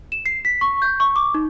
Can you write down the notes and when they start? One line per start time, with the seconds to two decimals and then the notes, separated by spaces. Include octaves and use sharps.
0.12 E7
0.26 C7
0.45 B6
0.61 C#6
0.82 G6
1.00 C#6
1.16 D6
1.34 D#4